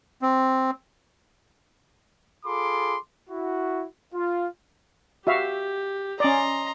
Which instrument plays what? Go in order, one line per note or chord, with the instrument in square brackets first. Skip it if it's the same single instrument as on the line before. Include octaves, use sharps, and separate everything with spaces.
[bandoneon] C4
[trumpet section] F4 G#4 A4 B5 C6 D6
E4 F#4
F4
[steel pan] F#4 E5 F5 [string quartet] G4
[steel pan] C#4 D5 [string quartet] D#5 A#5 C6